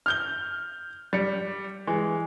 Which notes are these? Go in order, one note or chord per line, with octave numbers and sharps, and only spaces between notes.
F6 G6 G7
G3 C#7
E3 G#3